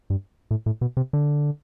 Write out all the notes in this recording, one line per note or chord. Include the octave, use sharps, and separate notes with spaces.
G2
A2
A2
B2
C3
D3